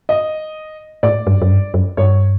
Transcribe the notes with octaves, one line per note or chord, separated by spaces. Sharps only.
D#5
A2 D5
G2
F#2
G2
F#2
G2 C#5